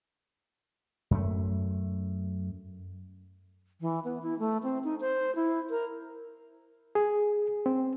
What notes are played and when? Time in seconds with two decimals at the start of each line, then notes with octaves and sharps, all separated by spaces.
1.11 F#2 A3
3.81 E3
4.04 B3
4.23 E4
4.39 A3
4.63 C4
4.84 D#4
5.01 C5
5.35 E4
5.70 A#4
6.95 G#4
7.66 C4